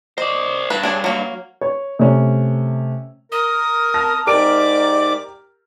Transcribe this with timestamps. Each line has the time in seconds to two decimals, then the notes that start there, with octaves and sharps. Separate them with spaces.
0.18 C5 D5 D#5
0.70 G2 B4
0.83 D4 G#4 C#5
1.04 F#3 A#3
1.61 C#5
1.99 C3 A3 C#4
3.32 A#4 D#6
3.94 A5 F6 A#6
4.27 G#2 G4 A#4 D5 D6 D7